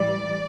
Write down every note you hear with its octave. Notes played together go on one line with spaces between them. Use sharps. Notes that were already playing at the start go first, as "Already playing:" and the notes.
Already playing: A2 E3 G3 D5